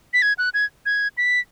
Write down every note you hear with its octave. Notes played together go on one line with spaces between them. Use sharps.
B6
G#6
F#6
G#6
G#6
B6